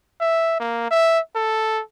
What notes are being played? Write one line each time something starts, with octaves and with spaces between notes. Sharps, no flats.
E5
A#3
E5
A4